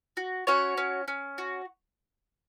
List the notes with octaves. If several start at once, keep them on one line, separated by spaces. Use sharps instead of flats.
F#4
C#4 F#4 C#5
C#4
C#4
F#4